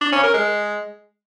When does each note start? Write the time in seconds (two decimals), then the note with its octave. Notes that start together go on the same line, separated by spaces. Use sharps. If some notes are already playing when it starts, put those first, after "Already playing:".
0.01 D4
0.12 C#4
0.23 A#4
0.34 G#3